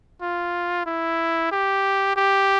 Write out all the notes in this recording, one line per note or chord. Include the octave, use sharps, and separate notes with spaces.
F4
E4
G4
G4